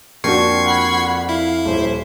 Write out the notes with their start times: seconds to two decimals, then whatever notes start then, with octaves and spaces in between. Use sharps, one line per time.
0.24 F2 F3 A#3 D4 F#4 C#6 G#6 C7
0.65 F#5 B5
1.29 E4 F5
1.65 D#1 C5